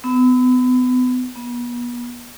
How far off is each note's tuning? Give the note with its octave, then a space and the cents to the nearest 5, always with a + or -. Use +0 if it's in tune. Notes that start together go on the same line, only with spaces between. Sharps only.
B3 +30
B3 -35